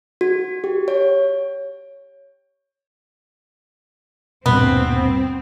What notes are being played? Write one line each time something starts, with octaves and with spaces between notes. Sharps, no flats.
F#4
G4
C#5
D#1 G2 B2 B3 C4